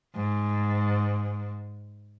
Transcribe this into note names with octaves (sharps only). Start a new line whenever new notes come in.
G#2